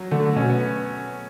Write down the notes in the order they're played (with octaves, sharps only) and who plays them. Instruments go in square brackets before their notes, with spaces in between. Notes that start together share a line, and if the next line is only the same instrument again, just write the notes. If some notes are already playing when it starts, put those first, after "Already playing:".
Already playing: [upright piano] F#3
[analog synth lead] D3 [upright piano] A3
[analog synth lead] B2 [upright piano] C#4
[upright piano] B3